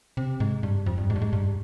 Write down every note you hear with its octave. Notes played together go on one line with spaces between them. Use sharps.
C3
G#2
G2
F2
G2
G#2
G2
G#2
G2